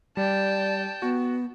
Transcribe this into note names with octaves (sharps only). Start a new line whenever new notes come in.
G3 D5 G5 A5
B3 F#4